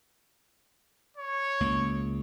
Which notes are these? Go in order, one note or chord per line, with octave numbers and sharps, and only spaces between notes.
C#5
C#2 A#3